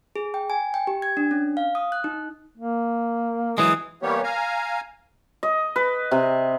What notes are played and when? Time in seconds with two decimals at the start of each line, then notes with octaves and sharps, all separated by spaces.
0.16 G#4
0.34 G5
0.50 G#5
0.74 G5
0.87 G4
1.02 G#6
1.17 D4
1.31 C#4
1.57 F5
1.75 D#6
1.92 F#6
2.04 D#4
2.58 A#3
3.58 E3 F#3 G#3 D#6
4.02 E3 G3 A#3 B3 G4 C#5
4.23 F5 G#5 A#5
5.43 D#5
5.76 B4
6.11 C3